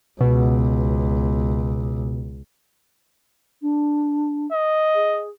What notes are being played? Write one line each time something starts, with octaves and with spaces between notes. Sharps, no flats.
C#2 B2
D4
D#5
G#4